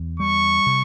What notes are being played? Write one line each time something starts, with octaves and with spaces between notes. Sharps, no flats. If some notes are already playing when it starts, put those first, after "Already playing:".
Already playing: E2
G3 C#6
C3